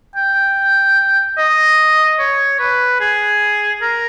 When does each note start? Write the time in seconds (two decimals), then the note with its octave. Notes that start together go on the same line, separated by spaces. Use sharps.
0.16 G5
1.38 D#5
2.20 C#5
2.60 B4
3.00 G#4
3.82 A#4